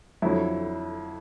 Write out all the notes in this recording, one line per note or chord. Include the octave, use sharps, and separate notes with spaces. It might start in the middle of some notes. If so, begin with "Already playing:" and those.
F2 D3 F#3 E4